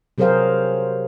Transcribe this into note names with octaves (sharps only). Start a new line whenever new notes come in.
C3 F#3 G#4 A#4 C5 F5